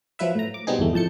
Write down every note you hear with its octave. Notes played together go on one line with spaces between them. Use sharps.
F3 F#3 E4 B4 E5
A2 A#5
D6
B2 G3 B3 C4 D#4 G#4
G1 E2 A3
F2 A2 A5 G6 C#7